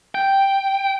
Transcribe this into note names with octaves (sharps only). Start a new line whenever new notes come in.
G5